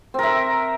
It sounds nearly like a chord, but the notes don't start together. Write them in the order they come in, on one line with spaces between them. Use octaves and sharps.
C4 A#4 E5